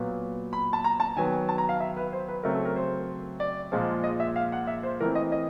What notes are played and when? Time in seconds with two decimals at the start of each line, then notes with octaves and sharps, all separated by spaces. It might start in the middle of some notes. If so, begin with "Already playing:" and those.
Already playing: A#2 F#3 B3
0.53 B5
0.73 A5
0.84 A#5
1.00 A5
1.16 D#3 F#3 B3 G#5
1.49 A5
1.58 A#5
1.69 F5
1.80 E5
1.97 B4
2.13 C5
2.28 B4
2.43 C#3 F#3 A3 C4 A#4
2.55 A4
2.65 A#4
2.76 C5
3.40 D5
3.72 A#2 F3 G#3
4.04 D#5
4.20 E5
4.36 F5
4.52 F#5
4.67 E5
4.83 C5
5.01 E3 A3 C4 A#4
5.15 D#5
5.32 D#5